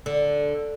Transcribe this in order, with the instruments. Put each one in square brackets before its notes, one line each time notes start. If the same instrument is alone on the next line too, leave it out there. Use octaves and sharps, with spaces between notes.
[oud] D3